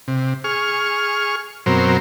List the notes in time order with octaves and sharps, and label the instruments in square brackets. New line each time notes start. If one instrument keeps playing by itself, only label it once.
[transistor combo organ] C3
G#4 C#6 F6
F#2 B2 F#3 C4 A#4 C5